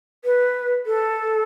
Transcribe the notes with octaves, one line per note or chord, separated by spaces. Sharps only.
B4
A4